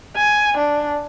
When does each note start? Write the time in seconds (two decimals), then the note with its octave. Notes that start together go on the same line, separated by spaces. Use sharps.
0.16 G#5
0.57 D4